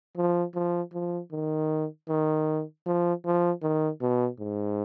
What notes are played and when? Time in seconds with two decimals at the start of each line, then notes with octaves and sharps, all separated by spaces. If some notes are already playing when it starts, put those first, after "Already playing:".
0.17 F3
0.55 F3
0.93 F3
1.32 D#3
2.09 D#3
2.86 F3
3.25 F3
3.63 D#3
4.01 B2
4.40 G#2